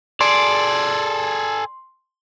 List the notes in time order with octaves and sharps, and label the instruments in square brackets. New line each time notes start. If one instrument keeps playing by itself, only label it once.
[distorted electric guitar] G#4 A4 [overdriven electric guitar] D5 [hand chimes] C6